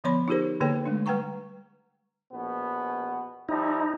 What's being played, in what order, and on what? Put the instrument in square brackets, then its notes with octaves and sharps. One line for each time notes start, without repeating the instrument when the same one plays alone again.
[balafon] D3 F3 B3 C#5 B5 C6
D#4 F4 G4 G#4 A#4 C5
D3 A#3 G#4 A4 C#5 G5
G#3 A3 D4
G3 B4 F#5 G5 A#5 C#6
[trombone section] A#1 B2 B3
[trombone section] F3 G3 E4 [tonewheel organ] D#4